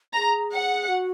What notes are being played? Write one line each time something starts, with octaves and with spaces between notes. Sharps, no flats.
G#4 A#5
F#5
F#4